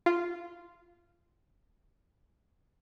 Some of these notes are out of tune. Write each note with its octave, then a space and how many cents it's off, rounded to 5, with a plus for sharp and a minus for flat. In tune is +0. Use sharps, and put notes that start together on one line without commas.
F4 -10